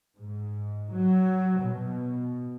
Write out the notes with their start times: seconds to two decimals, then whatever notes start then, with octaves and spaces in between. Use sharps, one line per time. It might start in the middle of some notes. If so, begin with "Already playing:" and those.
0.17 G#2
0.92 F#3
1.62 B2